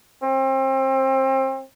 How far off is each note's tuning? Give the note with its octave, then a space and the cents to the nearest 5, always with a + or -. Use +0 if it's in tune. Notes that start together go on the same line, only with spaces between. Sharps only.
C4 +30